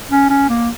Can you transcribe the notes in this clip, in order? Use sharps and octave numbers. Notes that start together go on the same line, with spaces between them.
C#4
C#4
A#3